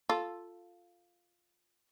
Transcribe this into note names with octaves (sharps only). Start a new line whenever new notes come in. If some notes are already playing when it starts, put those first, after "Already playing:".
F4 A4